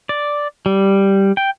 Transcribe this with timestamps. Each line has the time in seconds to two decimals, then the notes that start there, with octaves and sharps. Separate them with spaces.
0.09 D5
0.66 G3
1.37 G5